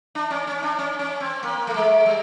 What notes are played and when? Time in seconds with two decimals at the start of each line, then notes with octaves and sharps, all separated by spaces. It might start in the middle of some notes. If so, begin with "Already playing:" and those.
0.15 D4
0.30 C#4
0.47 C#4
0.63 D4
0.79 C#4
0.99 C#4
1.20 C4
1.43 A#3
1.67 A3
1.74 G#3
2.06 G3